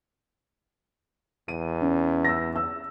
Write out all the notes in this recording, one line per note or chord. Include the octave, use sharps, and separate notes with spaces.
E2 D#7
C#4
E6 A#6
E6